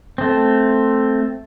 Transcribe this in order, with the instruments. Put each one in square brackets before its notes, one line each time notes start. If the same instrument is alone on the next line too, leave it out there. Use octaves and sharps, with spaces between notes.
[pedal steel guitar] A3 C4